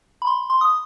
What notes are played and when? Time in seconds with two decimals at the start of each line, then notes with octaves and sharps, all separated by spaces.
0.22 B5
0.27 C6
0.50 C6
0.61 D#6